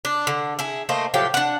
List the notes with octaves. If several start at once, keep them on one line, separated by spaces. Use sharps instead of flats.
D4
D3
E4 G#4
A3 A#3 C5 D#5
A2 F3 F#3 G4
D4 F#5